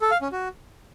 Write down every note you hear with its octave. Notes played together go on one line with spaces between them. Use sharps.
A4
F5
C#4
F#4